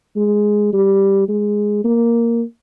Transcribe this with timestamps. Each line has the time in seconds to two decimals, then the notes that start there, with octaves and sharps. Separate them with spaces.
0.16 G#3
0.73 G3
1.28 G#3
1.84 A#3